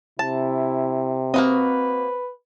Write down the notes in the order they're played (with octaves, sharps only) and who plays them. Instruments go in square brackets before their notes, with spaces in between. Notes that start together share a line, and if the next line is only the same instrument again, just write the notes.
[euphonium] C3 [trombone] E4 [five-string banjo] A5
[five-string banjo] A#3 F#4 D#5 [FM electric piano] C4 [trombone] B4